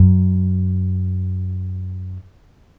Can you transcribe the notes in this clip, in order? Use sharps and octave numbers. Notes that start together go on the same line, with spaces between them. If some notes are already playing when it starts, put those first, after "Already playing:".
Already playing: F#2